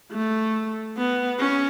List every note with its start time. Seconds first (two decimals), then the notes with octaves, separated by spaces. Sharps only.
0.12 A3
0.97 B3
1.39 C#4